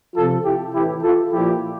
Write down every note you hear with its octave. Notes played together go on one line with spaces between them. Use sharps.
C3 F3 F4 A4
E4 G4
A2 E3 E4 G4
F4 A4
A#2 F3 E4 G4